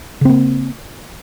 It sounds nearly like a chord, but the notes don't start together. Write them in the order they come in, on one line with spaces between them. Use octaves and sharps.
C#3 C4 A#3